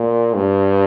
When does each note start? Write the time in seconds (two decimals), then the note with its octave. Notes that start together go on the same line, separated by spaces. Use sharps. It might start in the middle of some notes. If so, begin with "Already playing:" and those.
Already playing: A#2
0.35 G2